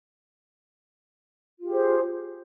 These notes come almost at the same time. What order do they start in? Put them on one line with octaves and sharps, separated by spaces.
F4 G4 G#4 C5